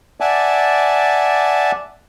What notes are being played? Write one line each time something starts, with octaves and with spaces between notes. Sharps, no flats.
D5 E5 F#5 G#5 A5 D6